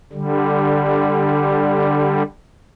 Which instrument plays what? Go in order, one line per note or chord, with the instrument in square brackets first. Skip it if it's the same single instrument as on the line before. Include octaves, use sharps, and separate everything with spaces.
[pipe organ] D3 G3